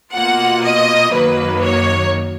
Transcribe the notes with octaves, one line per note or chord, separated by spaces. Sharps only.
B2 A#3 F4 F#5
D#5
F#2 D#3 F#3 A#3 B4
C#5